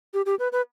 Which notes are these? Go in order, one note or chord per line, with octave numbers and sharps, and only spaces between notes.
G4
G4
B4
B4